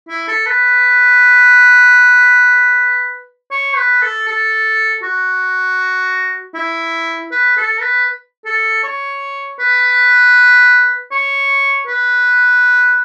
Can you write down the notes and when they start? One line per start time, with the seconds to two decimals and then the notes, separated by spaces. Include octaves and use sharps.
0.09 E4
0.28 A4
0.47 B4
3.51 C#5
3.76 B4
4.02 A4
4.27 A4
5.03 F#4
6.55 E4
7.31 B4
7.57 A4
7.81 B4
8.45 A4
8.83 C#5
9.59 B4
11.12 C#5
11.87 B4